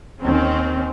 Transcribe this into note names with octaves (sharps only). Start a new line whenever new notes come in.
D#2 D#3 C4 C#4